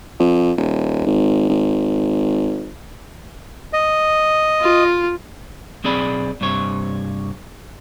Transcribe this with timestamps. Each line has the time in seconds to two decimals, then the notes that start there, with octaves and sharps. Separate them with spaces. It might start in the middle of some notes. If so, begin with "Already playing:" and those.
0.19 F2
0.57 D#1
1.06 G#1
1.49 G#1
3.73 D#5
4.61 F4
5.84 B1 C4 G#4 D5 B5
6.41 G2 C3 C#5